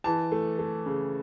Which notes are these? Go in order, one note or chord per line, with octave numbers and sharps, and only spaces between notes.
E3 A5
A3
A3
C#3